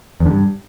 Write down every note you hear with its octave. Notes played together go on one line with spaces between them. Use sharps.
E2
D3
G2